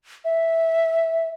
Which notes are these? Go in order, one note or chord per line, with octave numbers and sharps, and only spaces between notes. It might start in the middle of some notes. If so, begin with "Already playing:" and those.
E5